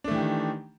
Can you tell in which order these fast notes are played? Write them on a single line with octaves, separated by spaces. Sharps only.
D4 A3 E3 G4 D#3